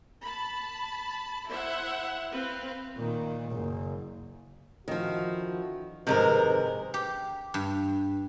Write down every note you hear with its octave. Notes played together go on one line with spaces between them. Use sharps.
A5 B5
E4 C5 E5 F#5
C4 B4 F5
A#2 D#3
F#1
D3 D#3 F3 E4 F#4
F2 G#2 C3 D#3 G#3 A#4 B4
G4
G2